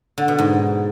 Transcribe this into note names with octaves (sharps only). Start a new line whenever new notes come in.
D3
B2
G#2